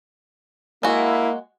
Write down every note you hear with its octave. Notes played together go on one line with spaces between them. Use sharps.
G#3 A#3 E4 F#4